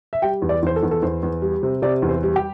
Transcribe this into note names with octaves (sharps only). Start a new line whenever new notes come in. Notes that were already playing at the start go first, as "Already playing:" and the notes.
E5
G3 G5
E2
D5
E2 C5
A4
E2
A4
E2 C5
E2
G3
C3
C3 D5
E2
C5
G3
G4